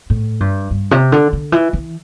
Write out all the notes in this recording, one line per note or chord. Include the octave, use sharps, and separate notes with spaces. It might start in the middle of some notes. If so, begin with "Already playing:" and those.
A2
G2
G2
C3
D3
D3
E3
E3